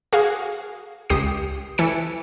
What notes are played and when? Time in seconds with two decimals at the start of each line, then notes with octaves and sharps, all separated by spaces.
0.13 F#4 G#4 F5
1.10 C#2 G4 D#6 C7
1.78 E3 A4 C#7